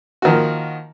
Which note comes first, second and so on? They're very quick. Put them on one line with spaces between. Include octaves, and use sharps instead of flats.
F#4 D#3 F3 A#3